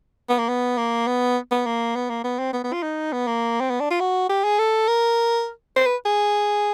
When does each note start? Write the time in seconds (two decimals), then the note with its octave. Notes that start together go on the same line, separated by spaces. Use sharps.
0.29 B3
0.39 A#3
0.49 B3
0.78 A#3
1.07 B3
1.51 B3
1.66 A#3
1.96 B3
2.10 A#3
2.24 B3
2.39 C4
2.53 B3
2.64 B3
2.73 F4
2.83 D#4
3.13 B3
3.27 A#3
3.61 C4
3.70 B3
3.81 D4
3.91 F4
4.00 F#4
4.29 G4
4.44 G#4
4.59 A4
4.88 A#4
5.76 C5
5.86 B4
6.06 G#4